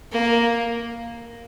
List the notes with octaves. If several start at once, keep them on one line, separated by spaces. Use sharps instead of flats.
A#3